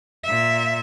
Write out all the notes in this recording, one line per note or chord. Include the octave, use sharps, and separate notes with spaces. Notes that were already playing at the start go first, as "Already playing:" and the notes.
A#2 E5